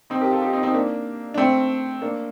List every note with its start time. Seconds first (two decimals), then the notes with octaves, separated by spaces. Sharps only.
0.10 C4 D#4
0.21 G4 A#4
0.31 F4 A4
0.42 D#4 G4
0.53 C4 D#4
0.63 C4 D#4
0.74 A#3 D4
1.34 D4
1.38 A3 C4
2.02 A#3 D4